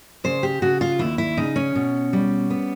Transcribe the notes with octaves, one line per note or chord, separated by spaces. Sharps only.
C#3 C5
G4
C#3 F#4
F4
D#2 E4
E4
C#3 D#4
C#4
B2
G3
B3